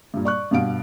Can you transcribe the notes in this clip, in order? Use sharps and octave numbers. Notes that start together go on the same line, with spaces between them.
G2 A#2
D5 C#6 F#6
G2 B2 F5 D7